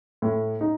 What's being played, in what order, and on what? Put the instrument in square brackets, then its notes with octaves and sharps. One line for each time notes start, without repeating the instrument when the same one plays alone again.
[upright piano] A2
D#4